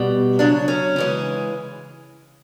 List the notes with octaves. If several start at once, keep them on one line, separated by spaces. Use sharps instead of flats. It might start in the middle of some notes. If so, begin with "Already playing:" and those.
Already playing: B2 G3
C#3 F#3 D4
C#4
C#3 E3 G#3